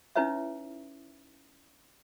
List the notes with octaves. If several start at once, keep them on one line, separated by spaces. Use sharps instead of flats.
C#4 D#4 E4 B4 C#5 E5